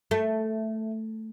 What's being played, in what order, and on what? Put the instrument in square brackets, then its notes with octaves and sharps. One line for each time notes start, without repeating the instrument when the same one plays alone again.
[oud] A3